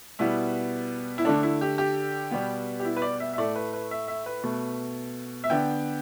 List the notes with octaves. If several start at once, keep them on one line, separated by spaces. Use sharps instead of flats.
B2 G3 B3 E4
E4
D3 A3 D4
E4
G4
G4
B2 G3 B3
G4
E4
B4
D5
E5
E5
A2 A3 D5
B4
B4
E5
E5
B4
B2 A3
E5
D3 B3 G5